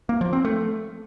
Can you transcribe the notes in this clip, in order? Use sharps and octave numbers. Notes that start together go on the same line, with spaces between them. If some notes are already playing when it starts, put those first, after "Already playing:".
A#3
F3
C4
A3